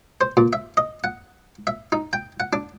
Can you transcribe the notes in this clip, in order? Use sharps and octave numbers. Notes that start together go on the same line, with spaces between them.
C5
A#2
E5
D#5
F#5
E5
D#4
G5
F#5
D4